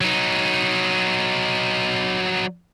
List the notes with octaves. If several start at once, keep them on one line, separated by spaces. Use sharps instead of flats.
F#3 D#4